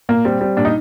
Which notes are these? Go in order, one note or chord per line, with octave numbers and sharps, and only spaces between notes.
A#2 A#3
G3 C4
G3
A#2 D4
D#4